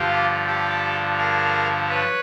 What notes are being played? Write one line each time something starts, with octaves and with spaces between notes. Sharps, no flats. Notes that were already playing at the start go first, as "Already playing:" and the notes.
Already playing: G2 D3 F3 F4 G4
G4 A4
G#4 A#4
B4 C#5